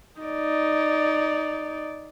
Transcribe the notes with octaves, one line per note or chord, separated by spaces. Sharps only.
D#4 D5